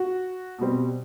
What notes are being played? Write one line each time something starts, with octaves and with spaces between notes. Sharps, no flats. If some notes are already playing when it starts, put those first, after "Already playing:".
Already playing: F#4
B2 G3 C4